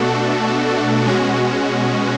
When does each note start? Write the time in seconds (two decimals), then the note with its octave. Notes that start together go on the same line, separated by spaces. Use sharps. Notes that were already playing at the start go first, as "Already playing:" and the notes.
Already playing: B2 A3 D4 F#4 A4
1.05 B2 G#3 C#4 F#4